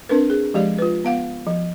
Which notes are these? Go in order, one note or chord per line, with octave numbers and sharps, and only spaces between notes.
C4 D4 A#4 B4
G#4
F3 G#3 G4 D5
F4 B4
B3 F5 F#5
F3